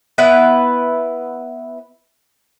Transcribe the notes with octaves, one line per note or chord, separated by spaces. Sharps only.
B3 E4 B4 E5